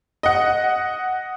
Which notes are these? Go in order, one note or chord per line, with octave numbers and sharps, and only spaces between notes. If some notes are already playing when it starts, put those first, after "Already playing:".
D#5 F#5